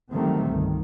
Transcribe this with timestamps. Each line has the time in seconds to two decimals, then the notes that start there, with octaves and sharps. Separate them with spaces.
0.11 D3 D#3 F#3 G3 A3 C4
0.47 G1 C2 D#3